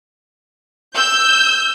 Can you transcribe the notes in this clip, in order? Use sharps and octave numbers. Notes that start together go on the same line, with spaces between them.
E6 G6